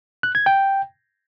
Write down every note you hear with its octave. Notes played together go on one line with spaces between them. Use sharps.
F#6
G#6
G5